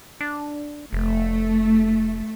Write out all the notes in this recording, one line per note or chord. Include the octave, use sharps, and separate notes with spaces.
D4
F1 A3